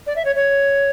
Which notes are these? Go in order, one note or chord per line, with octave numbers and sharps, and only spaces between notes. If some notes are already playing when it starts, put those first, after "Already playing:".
D5
E5
C#5
C#5